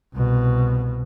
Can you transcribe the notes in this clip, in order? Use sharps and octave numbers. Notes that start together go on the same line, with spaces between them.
C2 B2